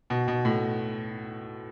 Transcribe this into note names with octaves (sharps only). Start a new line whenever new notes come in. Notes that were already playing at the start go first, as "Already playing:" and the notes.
B2
B2
A2